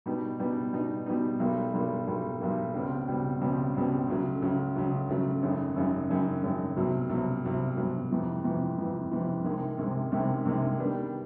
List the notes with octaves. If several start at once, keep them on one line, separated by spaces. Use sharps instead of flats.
B2 G3 B3 D#4
B2 G3 B3 D#4
B2 G3 B3 D#4
B2 G3 B3 D#4
B1 B2 G3 A#3
B1 B2 G3 A#3
B1 B2 G3 A#3
B1 B2 G3 A#3
C#2 B2 G3 C4
C#2 B2 G3 C4
C#2 B2 G3 C4
C#2 B2 G3 C4
C#2 C#3 F#3 A3
C#2 C#3 F#3 A3
C#2 C#3 F#3 A3
C#2 C#3 F#3 A3
G#1 F#2 C#3
G#1 F#2 C#3
G#1 F#2 C#3
G#1 F#2 C#3
C2 B2 F#3
C2 B2 F#3
C2 B2 F#3
C2 B2 F#3
F2 C3 E3
F2 C3 E3
F2 C3 E3
F2 C3 E3
C2 C3 D#3 G#3
C2 C3 D#3 G#3
C2 C3 D#3 G#3
C2 C3 D#3 G#3
D#3 G3 B3 D4 G4